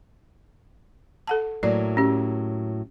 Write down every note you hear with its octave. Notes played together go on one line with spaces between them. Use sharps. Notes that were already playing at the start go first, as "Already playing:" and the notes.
A4 F#5 A5
A2 F#3 A#3 D5
C#4 G4